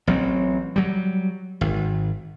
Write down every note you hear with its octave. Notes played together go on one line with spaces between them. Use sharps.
A1 F#3 C4
F#3 G3
G#1